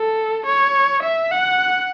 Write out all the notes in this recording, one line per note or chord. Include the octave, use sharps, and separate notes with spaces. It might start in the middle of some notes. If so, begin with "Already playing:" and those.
Already playing: A4
C#5
E5
F#5